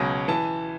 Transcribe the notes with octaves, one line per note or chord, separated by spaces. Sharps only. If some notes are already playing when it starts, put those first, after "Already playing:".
Already playing: C#2 B2 F#3
E3 A5